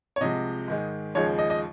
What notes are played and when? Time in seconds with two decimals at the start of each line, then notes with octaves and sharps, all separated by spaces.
0.16 C#5
0.21 C2 C3 F3 G#3 D#5
0.68 G#2 D#3 G#3
1.15 D#2 C#3 F3 G#3 C#5
1.39 D#5
1.50 D#5